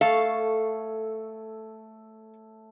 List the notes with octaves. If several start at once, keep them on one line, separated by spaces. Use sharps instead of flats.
A3 A4 C#5 F5